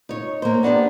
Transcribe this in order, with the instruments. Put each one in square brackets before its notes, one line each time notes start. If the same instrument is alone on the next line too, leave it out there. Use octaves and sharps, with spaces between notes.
[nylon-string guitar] D#4 C#5
A#3 C5
B3 D4 D#4 G4